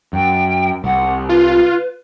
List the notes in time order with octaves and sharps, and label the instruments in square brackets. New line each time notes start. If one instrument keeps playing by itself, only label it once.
[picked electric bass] F#2 [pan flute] G5
[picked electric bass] C2 [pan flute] F#5
[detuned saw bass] F4 [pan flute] B4